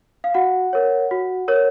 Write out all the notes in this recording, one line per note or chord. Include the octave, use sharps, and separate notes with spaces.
F5
F#4 F#5
A#4 C#5
F#4
A#4 C#5